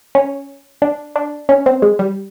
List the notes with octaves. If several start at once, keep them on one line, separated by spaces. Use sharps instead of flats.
C#4
D4
D4
C#4
C4
G#3
G3